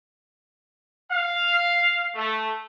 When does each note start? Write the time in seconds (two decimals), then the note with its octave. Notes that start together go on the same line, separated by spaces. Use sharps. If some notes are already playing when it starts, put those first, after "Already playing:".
1.12 F5
2.15 A3